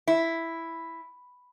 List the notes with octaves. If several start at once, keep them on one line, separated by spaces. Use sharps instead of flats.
E4